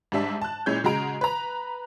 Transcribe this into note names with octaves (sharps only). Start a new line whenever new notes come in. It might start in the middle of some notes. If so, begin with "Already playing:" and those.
G#2 G3 D4 E5 A5
A5 F#6
A#2 G#3 C#4 E4 C#5 G6
C#3 G#3 F#4 A#5 D7
B4 A#5